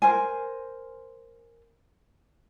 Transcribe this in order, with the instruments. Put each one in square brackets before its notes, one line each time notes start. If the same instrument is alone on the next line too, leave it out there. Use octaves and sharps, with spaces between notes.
[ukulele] A#4 C5 G#5